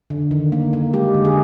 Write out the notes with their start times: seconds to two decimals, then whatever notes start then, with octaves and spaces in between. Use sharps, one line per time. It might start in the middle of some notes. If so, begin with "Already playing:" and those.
0.10 D3
0.31 D#3
0.52 A#3
0.73 A#3
0.93 G#3 G4
1.14 D3
1.25 G#4